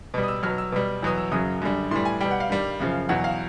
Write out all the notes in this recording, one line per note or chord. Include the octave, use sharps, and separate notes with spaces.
B2 G3
D#6
E6
B2 F#3 F6
E6
B2 G3
E2 B2 F#3 D#6
E6
F#2 C#3 F#3 D#6
F#2 D3 G3
A2 E3 G3 C6
G#5
B2 G3 G5
F#5
F5
G2 D#3 G3
F#2 C#3 F3
E2 B2 F#3 F#5
F5